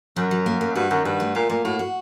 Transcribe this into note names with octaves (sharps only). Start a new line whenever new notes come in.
F#2 F#3
F#3
A#3
A#3
G2 F#4
F#2 D#3
G2 F#4
A3
A#2 A4
A#2 A#3
A2 F#4
F#4